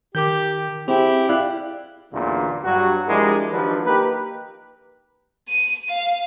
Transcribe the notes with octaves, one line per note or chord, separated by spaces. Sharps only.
D#3 G4 A#4 D6 G6
C4 E4 G4 G#4
E4 D5 F5 G5 F#6
A1 E2 A#2 D3 E3 F#3
G2 F#3 F#4
F3 G#3 D4 E4 G4 A#4
D#3 F3 F#3 D4 G4 B4
A#3 D#4 G4 A#4 B4
D#7
F5